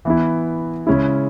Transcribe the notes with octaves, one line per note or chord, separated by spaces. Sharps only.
E3 B3 E4
C#3 G#3 C#4 E4